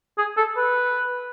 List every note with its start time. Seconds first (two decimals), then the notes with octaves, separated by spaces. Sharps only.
0.18 G#4
0.37 A4
0.57 B4